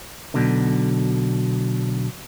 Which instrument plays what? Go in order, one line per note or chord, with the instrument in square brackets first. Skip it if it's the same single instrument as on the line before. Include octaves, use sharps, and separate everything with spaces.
[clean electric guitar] B1 B2 D3